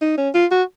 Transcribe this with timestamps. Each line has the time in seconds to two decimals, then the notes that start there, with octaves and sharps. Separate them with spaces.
0.02 D#4
0.18 C#4
0.34 F4
0.51 F#4